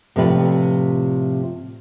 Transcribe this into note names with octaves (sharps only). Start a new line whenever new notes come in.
A2 C3 F3 B4 D5